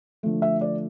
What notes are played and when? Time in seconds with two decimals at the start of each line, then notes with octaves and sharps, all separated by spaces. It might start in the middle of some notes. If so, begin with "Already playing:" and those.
0.23 D3 F3 A3
0.42 E5
0.61 D5